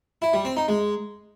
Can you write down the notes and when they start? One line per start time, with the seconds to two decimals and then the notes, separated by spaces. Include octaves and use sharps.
0.22 E4
0.33 G3
0.45 C4
0.57 D#4
0.68 G#3